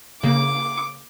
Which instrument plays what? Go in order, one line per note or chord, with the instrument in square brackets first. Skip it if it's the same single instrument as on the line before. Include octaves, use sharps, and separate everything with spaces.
[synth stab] C#3 A#3 [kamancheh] D6